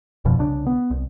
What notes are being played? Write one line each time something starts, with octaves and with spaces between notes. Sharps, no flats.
G1 F2 B2 F3
C2 C#3 D4
B3
C2